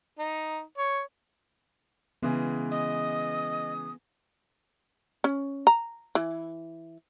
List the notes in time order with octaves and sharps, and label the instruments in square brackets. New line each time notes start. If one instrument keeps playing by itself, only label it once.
[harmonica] D#4
C#5
[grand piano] C#3 E3 G#3 [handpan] B3
[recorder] D#5 [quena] D#6
[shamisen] C#4
A#5
E3